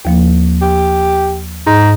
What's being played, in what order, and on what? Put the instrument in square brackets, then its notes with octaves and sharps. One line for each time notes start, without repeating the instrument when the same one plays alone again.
[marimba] D#2 F3 A#3
[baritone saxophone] G4
[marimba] G#2 [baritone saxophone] D#4